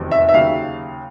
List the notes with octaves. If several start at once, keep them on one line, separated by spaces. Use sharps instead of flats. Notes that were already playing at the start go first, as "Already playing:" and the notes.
Already playing: F1 E2 C3 D#3 F#3
E5
E5
D#2 C#3 F#3 F5